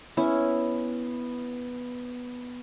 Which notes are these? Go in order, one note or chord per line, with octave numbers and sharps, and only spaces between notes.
B3 C#4 E4